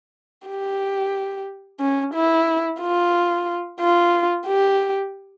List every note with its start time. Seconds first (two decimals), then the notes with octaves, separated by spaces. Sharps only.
0.47 G4
1.80 C#4
2.14 E4
2.81 F4
3.80 F4
4.47 G4